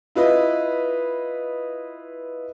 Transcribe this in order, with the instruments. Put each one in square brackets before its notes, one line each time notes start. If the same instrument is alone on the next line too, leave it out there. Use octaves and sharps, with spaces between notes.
[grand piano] E4 F4 B4 D#5